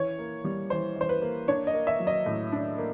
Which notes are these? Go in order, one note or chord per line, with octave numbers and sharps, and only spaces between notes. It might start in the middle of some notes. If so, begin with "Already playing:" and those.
Already playing: E3 C#5
A#3
G3
E3 C5
E3 C5
B4
A#3
D4 C#5
D#5
A#3
E5
F#3
D#5
A2
D4
A#3